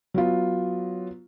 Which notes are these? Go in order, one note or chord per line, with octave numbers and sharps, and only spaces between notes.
F#3 B3 F4